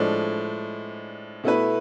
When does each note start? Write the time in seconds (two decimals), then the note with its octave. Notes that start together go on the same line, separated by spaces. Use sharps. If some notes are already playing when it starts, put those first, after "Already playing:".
Already playing: A2 F3 G#3 D4
1.44 B2 A3 E4 B4